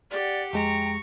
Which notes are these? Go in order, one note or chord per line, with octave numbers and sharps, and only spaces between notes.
G4 D5 F#5
F2 G#3 G5 A#5 C#6